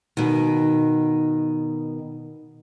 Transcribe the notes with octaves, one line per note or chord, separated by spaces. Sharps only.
B2 D#3